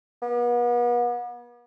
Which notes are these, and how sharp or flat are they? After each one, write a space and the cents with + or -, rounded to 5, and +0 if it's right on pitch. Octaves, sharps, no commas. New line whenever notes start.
B3 -40